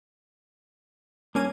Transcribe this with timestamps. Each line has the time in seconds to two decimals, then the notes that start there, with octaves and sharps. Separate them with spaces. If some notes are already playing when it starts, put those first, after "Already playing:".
1.35 G2 A#3 C#4 G#6 D#7